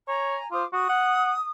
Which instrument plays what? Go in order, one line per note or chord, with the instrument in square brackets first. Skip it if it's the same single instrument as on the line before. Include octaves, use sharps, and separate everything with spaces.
[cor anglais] C#5 [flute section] G#5 A#5
[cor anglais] F4 [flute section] C5 D6 D#6
[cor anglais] F#4 [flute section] D#6
[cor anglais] F#5